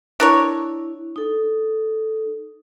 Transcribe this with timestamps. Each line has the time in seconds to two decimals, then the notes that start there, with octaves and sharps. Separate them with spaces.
0.20 D4 E4 A#4 C#5
1.16 D#4 A4